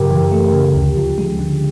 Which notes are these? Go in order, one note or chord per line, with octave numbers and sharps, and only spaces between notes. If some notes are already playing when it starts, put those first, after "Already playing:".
Already playing: F#2 C#3 G4 A#4
E3
A3
C#3
D2
F3
G#3
D3